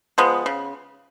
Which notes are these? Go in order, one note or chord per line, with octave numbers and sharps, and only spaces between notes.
F3 G#3 B3
C#3